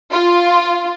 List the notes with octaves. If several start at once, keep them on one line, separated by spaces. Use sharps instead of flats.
F4